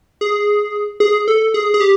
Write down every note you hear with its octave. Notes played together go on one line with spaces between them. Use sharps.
G#4
G#4
A4
G#4
G#4
G4